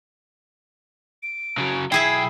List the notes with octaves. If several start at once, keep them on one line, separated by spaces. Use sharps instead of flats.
D7
C#3 F#3
B1 E4 G#4 E5 G5 C7